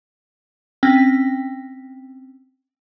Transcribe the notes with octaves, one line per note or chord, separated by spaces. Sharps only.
C4 C#4 G5